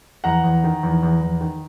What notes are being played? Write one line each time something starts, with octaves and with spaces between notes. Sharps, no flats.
E2 F#5 A#5
E2
D#3
E2
E2
E2
D#3